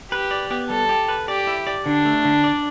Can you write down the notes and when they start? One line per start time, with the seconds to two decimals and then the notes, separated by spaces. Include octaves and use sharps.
0.12 G4 B4
0.31 D5
0.50 B3
0.70 G3 A4
0.89 G4
1.08 B4
1.28 G4 D5
1.47 E4
1.67 D5
1.86 D3 D4
2.05 A3
2.25 D3
2.44 D5